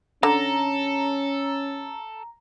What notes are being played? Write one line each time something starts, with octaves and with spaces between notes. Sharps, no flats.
D3 C#4 A4 A#5